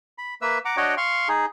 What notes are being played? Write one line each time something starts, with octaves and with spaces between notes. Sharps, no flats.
B5
A#3 B4 E5 E6
F#5 A#5 D6
D4 F#4 C#5 D#5 F#5 G5
F5 C6 C#6
D#4 G#4